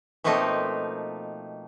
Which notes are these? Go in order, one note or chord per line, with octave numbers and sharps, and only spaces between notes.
B2 F3 A3 A#3 C4 D#4